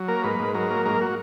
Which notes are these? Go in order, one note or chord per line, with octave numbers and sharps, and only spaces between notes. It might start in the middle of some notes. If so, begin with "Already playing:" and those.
Already playing: F#3
A#3 A#4
G#2 B4
G#2
F#3 A#4
A#3
G#2 A#4
F#4